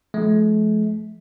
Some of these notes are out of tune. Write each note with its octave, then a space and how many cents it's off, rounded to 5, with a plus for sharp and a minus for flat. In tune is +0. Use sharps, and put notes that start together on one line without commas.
F3 +0 A3 -45